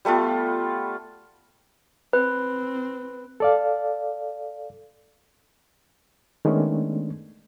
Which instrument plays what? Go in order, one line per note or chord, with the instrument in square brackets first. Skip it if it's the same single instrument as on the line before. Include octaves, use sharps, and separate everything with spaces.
[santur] G3 A3 B3 F4
[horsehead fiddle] C4 [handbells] B4
[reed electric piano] A4 D5 F5
D#3 G#3 A3 B3 C#4 D4